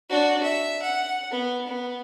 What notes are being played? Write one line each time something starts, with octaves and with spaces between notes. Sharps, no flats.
D4 F#4
E5
F#5
B3
B3